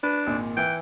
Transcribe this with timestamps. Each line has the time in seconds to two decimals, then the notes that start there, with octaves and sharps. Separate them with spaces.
0.03 D4 B4
0.27 G#1 A#2
0.57 E3 G5